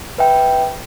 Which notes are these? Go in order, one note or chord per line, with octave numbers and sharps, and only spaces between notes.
B4 E5 G5